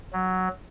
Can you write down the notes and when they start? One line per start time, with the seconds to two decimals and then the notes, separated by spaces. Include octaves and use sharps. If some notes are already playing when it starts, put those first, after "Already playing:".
0.13 F#3